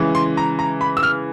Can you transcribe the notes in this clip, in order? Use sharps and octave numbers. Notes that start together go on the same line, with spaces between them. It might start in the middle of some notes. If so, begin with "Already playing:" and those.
Already playing: C#3 E3 G#3
C6
A#5
A#5
B5
E6
F6